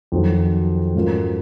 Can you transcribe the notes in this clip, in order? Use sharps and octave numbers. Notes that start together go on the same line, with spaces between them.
F2 D#3 F#3
G#2 F#3 C#4 F4 A#4